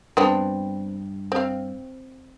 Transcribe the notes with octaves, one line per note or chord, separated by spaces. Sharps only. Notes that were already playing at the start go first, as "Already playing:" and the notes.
G2 B3 C4 D4
C4 F5